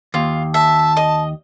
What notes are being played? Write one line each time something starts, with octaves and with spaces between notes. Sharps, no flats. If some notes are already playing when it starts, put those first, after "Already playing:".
D#2 F4
E5 A5
D#5